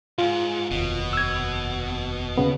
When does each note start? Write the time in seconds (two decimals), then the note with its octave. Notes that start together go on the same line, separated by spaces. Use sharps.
0.18 D2 G#2 F4
0.71 F1 D#2 B2
1.13 E6 G#6
2.38 D#2 C#3 B3